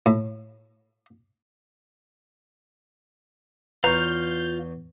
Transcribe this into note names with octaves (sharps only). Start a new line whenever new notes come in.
A2
E2 F4 B4 C#5 F5 A#5 G6